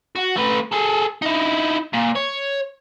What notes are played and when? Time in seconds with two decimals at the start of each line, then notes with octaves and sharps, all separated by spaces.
0.16 F#4
0.36 A3 B4
0.72 G#4 A4
1.22 D#4 E4
1.94 A#2
2.16 C#5